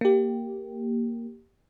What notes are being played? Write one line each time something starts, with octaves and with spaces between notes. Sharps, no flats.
A#3 G4